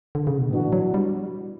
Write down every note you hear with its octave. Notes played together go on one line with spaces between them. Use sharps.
D3
C#3
B2
A2 E3 B3 D4 F#4
F#3
G3